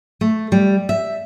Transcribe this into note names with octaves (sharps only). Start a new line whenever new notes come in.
A3
G3
E5